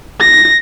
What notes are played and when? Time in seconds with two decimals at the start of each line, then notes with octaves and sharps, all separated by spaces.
0.20 A#6